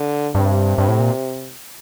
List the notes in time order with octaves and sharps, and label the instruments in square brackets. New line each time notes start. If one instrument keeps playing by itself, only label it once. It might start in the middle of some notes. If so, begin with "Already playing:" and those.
Already playing: [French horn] D3
[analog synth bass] G2 [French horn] C3
[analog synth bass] G2
A2
A#2